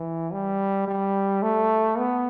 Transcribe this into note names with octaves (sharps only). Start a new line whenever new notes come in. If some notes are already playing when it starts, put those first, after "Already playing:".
Already playing: E3
G3
G3
A3
B3